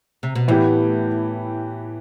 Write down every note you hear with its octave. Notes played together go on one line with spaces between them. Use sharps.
C3
B2
A2 E3 B3 E4 G4